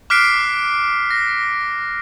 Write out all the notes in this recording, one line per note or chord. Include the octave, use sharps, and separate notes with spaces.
D6 F6 F#6 B6 C7 D7
A#6